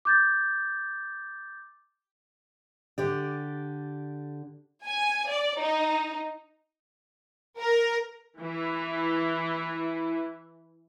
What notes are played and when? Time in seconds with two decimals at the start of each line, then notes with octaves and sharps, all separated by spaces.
0.05 D6 G6 A6
2.98 D3 G4 D5
4.85 G#5
5.30 D5
5.60 D#4
7.59 A#4
8.40 E3 E4